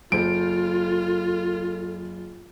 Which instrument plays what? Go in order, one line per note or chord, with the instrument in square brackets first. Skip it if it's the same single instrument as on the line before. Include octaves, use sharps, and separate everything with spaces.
[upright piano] F#1 C5 [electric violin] F4 [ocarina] A4 [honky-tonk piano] D7